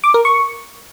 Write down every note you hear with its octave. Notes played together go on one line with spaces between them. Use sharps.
D6
A#4
C#6